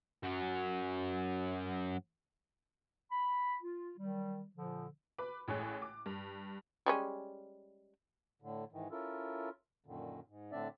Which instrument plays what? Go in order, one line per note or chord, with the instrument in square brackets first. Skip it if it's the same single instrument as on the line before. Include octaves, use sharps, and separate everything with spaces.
[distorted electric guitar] F#2 F#3
[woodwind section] B5
F4
D#3 F#3 G3
A#2 D3 F3
[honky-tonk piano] B4 B5 D6
A1 A2 G#3 C#5 G#5 F#6
D6
G2
[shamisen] G3 G#3 C#4
[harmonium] A2 D3
G#2 D#3 E3
C#4 E4 F4 A4 A#4
F#2 A#2 D3 D#3
G#2
A2 D3 C4 D4 D5 E5